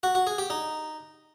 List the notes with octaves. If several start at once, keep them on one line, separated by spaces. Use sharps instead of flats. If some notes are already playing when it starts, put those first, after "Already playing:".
F#4
F#4
G#4
G4
D#4